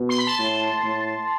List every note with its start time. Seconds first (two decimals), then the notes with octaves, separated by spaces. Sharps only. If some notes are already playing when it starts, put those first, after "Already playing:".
Already playing: B2
0.09 C6
0.18 B5
0.27 A5 C6
0.39 A2
0.84 A2